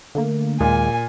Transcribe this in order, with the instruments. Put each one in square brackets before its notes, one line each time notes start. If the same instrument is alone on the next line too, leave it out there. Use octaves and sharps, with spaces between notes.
[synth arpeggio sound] D3 A3 A#3
[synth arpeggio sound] D#2 G#3 [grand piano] A#2 [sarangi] G#5